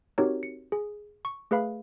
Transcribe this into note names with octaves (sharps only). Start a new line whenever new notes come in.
C4 D#4 F#4 G4 A#4 C#5
C#7
G#4
C#6
A3 G#4 B4 F5 B5